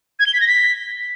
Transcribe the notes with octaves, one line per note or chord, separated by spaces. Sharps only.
G#6
G7
B6
A#6
B6